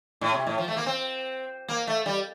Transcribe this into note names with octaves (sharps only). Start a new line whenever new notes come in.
A2
C3
A2
F3
A3
A#3
C4
A#3
A3
G3